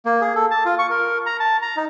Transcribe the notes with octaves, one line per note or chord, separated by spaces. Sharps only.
A#3
G#4
A4
A5
F4
C#6
A#4
A#5
A5
A#5
D#4